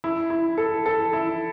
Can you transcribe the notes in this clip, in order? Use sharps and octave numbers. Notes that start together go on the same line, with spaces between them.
E4
E4
A4
A4
E4